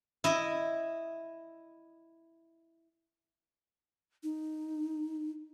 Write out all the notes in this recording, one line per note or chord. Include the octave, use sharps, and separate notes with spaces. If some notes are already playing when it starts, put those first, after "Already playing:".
E4 D#5
D#4